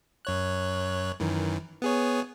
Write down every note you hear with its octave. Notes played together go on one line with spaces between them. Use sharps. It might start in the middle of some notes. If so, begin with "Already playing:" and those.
F#2 C#5 F#6
F#2 D#3 E3
B3 G#4 C#5